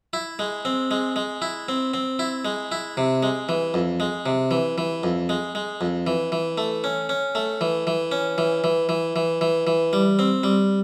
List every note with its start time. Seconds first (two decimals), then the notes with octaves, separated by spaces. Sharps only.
0.13 E4
0.39 G#3
0.65 C4
0.91 G#3
1.16 G#3
1.42 E4
1.69 C4
1.94 C4
2.19 E4
2.45 G#3
2.72 E4
2.97 C3
3.23 G#3
3.49 E3
3.74 F2
4.00 G#3
4.26 C3
4.51 E3
4.78 E3
5.03 F2
5.29 G#3
5.55 G#3
5.81 F2
6.07 E3
6.32 E3
6.58 A3
6.84 C#4
7.09 C#4
7.35 A3
7.61 E3
7.87 E3
8.12 C#4
8.38 E3
8.64 E3
8.89 E3
9.16 E3
9.41 E3
9.67 E3
9.93 G3
10.19 C4
10.43 G3